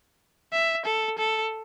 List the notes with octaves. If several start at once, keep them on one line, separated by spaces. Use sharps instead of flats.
E5
A4
A4